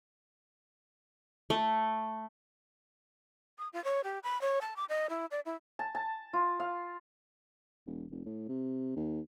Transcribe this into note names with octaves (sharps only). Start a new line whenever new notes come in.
A3
D#6
F4
C#5
G4
B5
C#5
A5
D6
D#5
E4
D5
E4
A5
A5
F4
F5
E1
F1
A2
C3
D#2